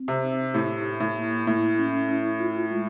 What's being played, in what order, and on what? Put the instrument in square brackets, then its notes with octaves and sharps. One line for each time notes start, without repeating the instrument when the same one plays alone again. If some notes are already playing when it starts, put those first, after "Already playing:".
Already playing: [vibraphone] C4
[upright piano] C3
[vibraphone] D#4
[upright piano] A2 [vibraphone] G4
[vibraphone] E4
[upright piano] A2
[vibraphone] A#3
[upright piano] A2 [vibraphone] E4
[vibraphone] C#4
E4
F4
G#3